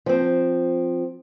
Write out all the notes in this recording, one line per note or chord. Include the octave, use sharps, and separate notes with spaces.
F3 C4